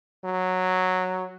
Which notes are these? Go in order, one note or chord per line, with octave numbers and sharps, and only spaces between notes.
F#3